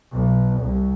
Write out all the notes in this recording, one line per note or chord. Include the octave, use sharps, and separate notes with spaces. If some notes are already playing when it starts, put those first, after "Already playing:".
B1
C2